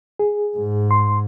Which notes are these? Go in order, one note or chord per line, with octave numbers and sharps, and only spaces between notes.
G#4
G#2
C6